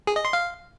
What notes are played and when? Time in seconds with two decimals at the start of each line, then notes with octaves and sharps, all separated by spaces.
0.07 G#4
0.16 D#5
0.25 C6
0.33 F5